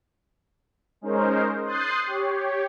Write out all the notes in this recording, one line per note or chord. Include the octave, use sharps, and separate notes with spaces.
G#3 C#4 D#4 A#4 C5
C6 D#6 F#6 G6 A6 C7
G4 C#5